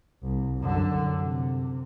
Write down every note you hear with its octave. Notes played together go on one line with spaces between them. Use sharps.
C2
F#2 D3
C3